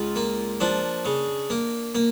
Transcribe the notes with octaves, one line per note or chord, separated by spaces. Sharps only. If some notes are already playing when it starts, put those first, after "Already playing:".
Already playing: C#2 F4
A#3
F3 D4
C#3
A#3
A#3